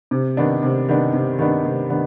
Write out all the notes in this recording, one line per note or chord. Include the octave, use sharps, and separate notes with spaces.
C3
D#3 B3 D4
C3
D#3 B3 D4
C3
D#3 B3 D4
C3
D#3 B3 D4